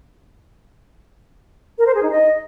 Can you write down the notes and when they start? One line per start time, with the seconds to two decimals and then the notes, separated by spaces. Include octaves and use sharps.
1.78 A#4
1.87 C5
1.95 G#4
2.03 D#4
2.11 D#5